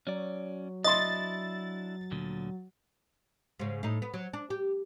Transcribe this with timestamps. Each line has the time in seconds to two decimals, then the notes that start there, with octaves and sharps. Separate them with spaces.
0.07 F#3 C#4 D5
0.84 D4 E4 D#5 C6 A6
2.11 D2 A#2 D3
3.59 G#2 C#3
3.83 A2 D#4
4.02 B3
4.14 F#3
4.33 D4
4.50 G4